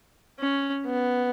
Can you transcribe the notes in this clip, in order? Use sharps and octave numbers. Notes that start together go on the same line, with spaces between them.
C#4
B3